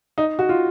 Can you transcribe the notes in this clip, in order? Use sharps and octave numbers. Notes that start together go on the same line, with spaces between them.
D#4
F#4
F4